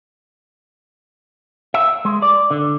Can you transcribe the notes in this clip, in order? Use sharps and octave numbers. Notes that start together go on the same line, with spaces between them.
E5
G#3
D5
D3